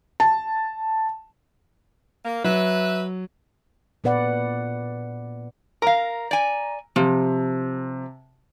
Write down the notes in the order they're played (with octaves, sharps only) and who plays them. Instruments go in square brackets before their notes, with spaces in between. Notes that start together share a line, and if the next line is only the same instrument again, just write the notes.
[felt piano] A5
[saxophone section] A#3
[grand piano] F#3 [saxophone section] B4 E5
[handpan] A#2 B3 B4 D5 F#5
[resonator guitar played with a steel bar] A#4 F5 [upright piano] A#5
[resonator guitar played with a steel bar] D5 G#5
[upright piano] C3 [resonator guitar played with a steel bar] F3